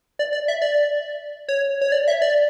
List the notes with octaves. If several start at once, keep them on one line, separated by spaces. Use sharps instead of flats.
D5
D5
E5
D5
C#5
C#5
D5
E5
D5